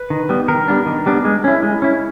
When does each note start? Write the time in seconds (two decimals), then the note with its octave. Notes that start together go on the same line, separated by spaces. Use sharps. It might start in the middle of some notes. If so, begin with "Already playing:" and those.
Already playing: B4
0.10 D#3
0.29 G3 B3
0.48 D#3 A#4
0.68 G3 B3 D4
0.86 D#3
1.06 G3 B3 D4
1.25 G#3
1.44 C#4 E4
1.63 G#3
1.82 C#4 E4